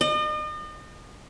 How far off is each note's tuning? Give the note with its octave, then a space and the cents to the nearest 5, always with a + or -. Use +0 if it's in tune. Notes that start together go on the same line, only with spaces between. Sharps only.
D#5 -40